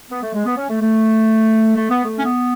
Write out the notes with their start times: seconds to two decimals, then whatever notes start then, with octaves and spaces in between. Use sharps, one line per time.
0.11 B3
0.22 A3
0.34 G#3
0.46 B3
0.57 C#4
0.69 A3
0.81 A3
1.77 A3
1.90 B3
2.04 A3
2.19 C#4
2.25 B3